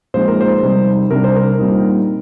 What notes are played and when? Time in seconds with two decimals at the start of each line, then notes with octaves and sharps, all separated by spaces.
0.14 A#2 F3 G#3 C4 D#4 C5
0.28 A#4
0.41 C5
0.62 C3 G3 C4 D#4
1.11 C3 G3 D4 A#4
1.24 C5
1.36 A#4
1.59 A#2 G3 C4 D#4